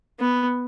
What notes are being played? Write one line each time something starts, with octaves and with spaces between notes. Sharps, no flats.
B3